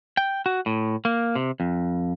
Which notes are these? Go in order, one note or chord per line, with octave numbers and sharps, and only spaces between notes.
G5
F#4
A2
A#3
C3
F2